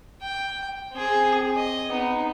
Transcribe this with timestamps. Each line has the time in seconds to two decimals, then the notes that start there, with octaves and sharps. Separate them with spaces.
0.22 G5
0.93 C4 G#4
1.56 D#5
1.89 B3 D#4